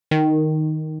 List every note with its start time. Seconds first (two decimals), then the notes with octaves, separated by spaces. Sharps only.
0.11 D#3